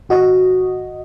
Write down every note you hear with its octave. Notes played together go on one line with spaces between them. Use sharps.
G#1 F#4 D#5